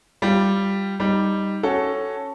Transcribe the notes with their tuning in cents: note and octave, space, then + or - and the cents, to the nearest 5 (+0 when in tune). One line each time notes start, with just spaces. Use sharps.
G3 +0 F4 -15
G3 +0 D#4 +0
C#4 +0 F#4 +20 A4 +0